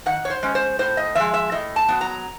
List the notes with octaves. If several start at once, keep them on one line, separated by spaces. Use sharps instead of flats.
D#3 F#5
C#5
C5
G#3 C#4
C5
A2 C5
D#5
F3 G#3 E5
E5
A2 D#5
A5
F#3 B3
A#5